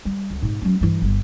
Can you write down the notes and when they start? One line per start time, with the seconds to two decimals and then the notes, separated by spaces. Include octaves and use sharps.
0.05 G3
0.30 C#2
0.42 G#2 C3
0.61 F#3 C#4
0.81 G2 E3
1.02 G1 G3